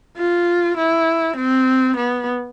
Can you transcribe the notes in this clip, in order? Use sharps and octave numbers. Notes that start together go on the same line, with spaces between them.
F4
E4
C4
B3